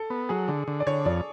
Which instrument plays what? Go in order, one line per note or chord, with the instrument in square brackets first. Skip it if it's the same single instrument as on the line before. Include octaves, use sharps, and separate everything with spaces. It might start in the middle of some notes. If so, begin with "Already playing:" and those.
Already playing: [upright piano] A4
[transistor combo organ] B3
[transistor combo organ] F#3 [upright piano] G#4
[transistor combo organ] D3
D3
[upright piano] D5
[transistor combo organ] D3 [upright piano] C#5
[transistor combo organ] F2 [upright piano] D5